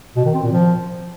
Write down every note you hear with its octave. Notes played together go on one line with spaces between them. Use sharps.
B2
D#3
C4
A#2
F3